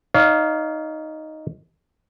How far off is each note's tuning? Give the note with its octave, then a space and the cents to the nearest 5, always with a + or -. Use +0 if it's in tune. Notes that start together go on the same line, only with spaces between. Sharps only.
D#4 +0 C#5 +45 F5 +0